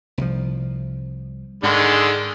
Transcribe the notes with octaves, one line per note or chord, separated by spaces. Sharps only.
C2 F3
G#2 D3 D#3 G#3